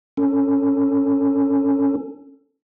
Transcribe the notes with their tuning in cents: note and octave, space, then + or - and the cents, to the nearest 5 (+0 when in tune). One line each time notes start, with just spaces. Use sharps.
C#4 +0 A4 +20